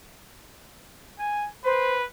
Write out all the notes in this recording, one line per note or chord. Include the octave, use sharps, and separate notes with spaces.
G#5
B4 C5